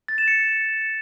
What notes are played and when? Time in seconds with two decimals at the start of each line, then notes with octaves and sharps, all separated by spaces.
0.08 A6
0.18 E7
0.28 C#7